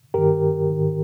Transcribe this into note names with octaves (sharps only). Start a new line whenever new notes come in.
G2 D#3 G4 A#4
G#2 D#3